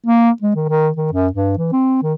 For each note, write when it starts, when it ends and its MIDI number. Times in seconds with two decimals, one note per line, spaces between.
0.07 0.30 58
0.42 0.54 56
0.56 0.66 51
0.69 0.89 51
0.96 1.10 51
1.13 1.28 42
1.33 1.55 43
1.58 1.71 52
1.73 2.01 60
2.03 2.13 51